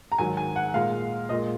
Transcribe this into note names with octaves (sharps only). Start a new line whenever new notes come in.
A#5
G#2 D#3 F#3 G#5
G#5
F#5
A#2 G#3 F5
A#2 G#3 D#5